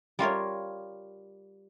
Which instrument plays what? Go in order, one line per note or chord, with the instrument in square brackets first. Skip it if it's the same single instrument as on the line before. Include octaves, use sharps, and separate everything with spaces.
[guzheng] G3 F4 A#4 C#5